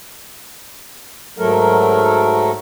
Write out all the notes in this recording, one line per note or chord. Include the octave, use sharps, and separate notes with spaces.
G#2 F#3 A3 A4 A#4